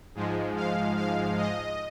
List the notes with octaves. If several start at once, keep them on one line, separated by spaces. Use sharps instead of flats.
G#2 F3 G#3
F5
F5
D#5